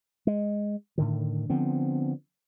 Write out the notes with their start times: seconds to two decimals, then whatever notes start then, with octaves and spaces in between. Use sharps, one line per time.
0.27 G#3
0.98 A2 D3 D#3
1.50 D3 F3 B3 C4